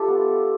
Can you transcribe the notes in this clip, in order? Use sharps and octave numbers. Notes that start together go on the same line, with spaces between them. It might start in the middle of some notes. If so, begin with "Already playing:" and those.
Already playing: A3 D4 F4 G4 A4
B3